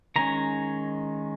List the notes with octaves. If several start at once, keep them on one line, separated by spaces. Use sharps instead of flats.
D#3 G#3 C#4 A#5